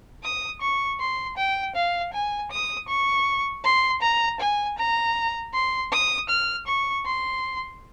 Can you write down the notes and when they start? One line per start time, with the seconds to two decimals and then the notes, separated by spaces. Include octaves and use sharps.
0.23 D#6
0.61 C#6
1.00 C6
1.37 G5
1.75 F5
2.13 G#5
2.51 D#6
2.88 C#6
3.65 C6
4.02 A#5
4.40 G#5
4.78 A#5
5.54 C6
5.92 D#6
6.29 F6
6.67 C#6
7.06 C6